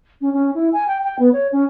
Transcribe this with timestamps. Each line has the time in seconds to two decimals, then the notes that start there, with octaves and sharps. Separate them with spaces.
0.21 C#4
0.33 C#4
0.55 E4
0.73 G#5
0.88 G5
1.04 G5
1.19 B3
1.33 C#5
1.52 C#4